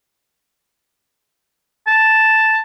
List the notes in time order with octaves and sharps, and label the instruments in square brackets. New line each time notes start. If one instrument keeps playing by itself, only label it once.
[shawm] A5